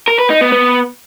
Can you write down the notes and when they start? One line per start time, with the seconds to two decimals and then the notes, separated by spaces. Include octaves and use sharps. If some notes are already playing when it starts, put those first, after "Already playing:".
0.08 A#4
0.19 B4
0.30 D#4
0.41 B3
0.52 B3